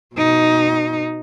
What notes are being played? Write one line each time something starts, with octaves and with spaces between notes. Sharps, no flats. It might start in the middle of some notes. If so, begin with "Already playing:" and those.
B2 D#4